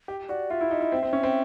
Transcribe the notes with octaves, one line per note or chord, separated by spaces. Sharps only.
G4
F#4 D5
F4 E5
E4
D#4
E4
C4
C4
C#4
C4